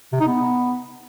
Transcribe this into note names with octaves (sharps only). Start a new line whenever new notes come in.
C3
D#4
B3